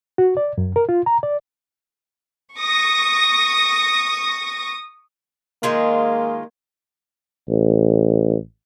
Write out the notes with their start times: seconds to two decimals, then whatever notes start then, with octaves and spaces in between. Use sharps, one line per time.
0.18 F#4
0.37 D5
0.58 F#2
0.76 A#4
0.89 F4
1.06 A#5
1.23 D5
2.57 C#6 D#6 A#6
5.63 D#3 G#3 A#3 F4
7.49 A1